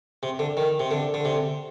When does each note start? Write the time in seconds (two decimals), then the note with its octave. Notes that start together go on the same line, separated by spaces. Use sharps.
0.23 C3
0.39 D3
0.57 D#3
0.80 C3
0.91 D3
1.14 D3
1.25 C3